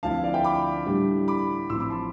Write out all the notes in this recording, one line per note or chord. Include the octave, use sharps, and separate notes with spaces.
D2 D3 F3 C4 E4 F5 A5
D5 F5
E5 G5
B5 D6
A2 G3 D4
B5 D6
A1 A2 F3 C4 C6 E6
B5 D6
A5 C6